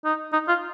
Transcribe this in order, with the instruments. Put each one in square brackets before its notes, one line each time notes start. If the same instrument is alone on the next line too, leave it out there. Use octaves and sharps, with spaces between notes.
[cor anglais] D#4
D#4
F4